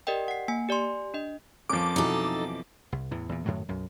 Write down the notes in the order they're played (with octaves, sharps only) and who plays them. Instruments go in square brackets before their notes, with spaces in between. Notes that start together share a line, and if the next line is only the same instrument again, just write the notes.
[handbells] G4 A#4 D5 D#5 G5
F#5 C7
A#3 G#5
G4 D5 G#5 C6
D4 D#5
[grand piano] F2 F3 [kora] C#4 A#4 [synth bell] D6
[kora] B2 E3 F#3 [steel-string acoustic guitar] D#4 A4
[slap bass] C2
E2 A2 E3
E2 A#2
F#2 A2 D#3 F#3
B1 F#2